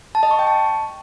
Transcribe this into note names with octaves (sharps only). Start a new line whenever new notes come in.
A5
D#5
C#6
G5
A5